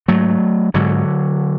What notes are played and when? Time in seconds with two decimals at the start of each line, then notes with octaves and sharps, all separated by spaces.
0.08 G#2 F#3 A3
0.74 G#2 D3 F#3